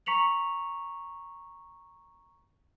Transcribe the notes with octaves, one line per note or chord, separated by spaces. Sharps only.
A#5 C#6 B6 C#7 F7 F#7